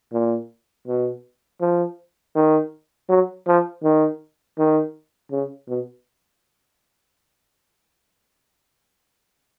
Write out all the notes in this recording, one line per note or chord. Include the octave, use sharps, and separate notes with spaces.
A#2
B2
F3
D#3
F#3
F3
D#3
D#3
C#3
B2